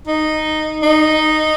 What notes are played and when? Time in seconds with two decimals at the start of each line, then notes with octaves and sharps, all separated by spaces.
0.08 D#4
0.83 D#4